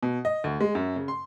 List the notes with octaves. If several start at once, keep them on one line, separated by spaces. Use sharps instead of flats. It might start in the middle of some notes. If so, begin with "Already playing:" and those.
B2
D#5
D2
G#3
F#2
C#3
C6